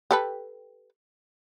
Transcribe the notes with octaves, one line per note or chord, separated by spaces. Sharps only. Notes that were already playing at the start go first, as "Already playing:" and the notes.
G4 A4 B4